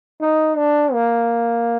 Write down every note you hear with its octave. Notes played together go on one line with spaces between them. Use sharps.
D#4
D4
A#3